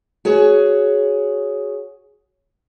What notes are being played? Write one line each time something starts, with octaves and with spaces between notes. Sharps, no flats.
F#4 G#4 C#5